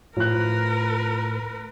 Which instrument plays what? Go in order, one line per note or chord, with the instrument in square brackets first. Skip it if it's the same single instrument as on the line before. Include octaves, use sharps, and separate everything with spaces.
[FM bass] A2 [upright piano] F3 F#6 [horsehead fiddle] A#4 B4